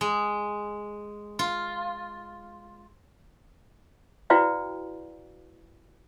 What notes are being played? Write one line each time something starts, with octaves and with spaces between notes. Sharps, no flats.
G#3
F4
E4 F#4 B4 D5 F5 G5